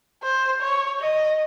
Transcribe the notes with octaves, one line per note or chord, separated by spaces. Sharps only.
C5
C#5
D#5